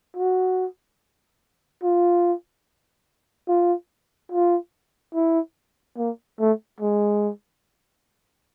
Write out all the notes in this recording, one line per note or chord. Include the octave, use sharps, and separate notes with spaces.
F#4
F4
F4
F4
E4
A#3
A3
G#3